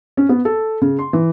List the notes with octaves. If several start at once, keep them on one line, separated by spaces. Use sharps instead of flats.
C#4
B3
A4
C#3
C6
E3